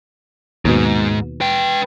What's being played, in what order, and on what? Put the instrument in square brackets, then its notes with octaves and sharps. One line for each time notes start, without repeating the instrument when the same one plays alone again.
[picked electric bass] D#2 B2 [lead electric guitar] G#2
[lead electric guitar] B4 G5